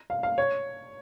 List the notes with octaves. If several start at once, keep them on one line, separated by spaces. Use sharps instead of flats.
F5
F5
C#5